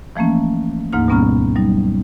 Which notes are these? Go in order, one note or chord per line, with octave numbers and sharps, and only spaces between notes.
E3 F3 A3 A#3 C#4
D2 G#2 A#3 D#4 F6
B2 G3 B3 C#4 A#5 F6
F#3 G3 D#4